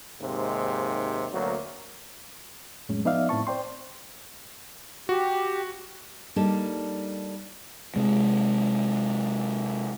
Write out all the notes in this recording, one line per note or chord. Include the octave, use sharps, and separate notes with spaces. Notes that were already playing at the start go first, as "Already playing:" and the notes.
D#2 G#2 C3
D2 F#3 A#3
F2 A2 F#3 G#3 C#4
F3 B3 D#4 D5 E5 F5
A2 C4 E4 A5 C#6
C5 D5 G5 C6
F#4 G4
G3 A#3 D4 D#4 A4
C3 G#3